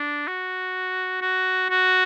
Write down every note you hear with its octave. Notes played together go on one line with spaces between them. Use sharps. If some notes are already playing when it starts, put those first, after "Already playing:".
Already playing: D4
F#4
F#4
F#4